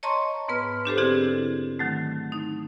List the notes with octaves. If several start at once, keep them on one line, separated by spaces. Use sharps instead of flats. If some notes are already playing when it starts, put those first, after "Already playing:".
C#5 D#5 A5 A#5 C6 C#6
G#2 B3 B4 F6
D4 G4 A4 C5
D3 C4 E4 G4 G#4
D#3 F#3 A3
D#4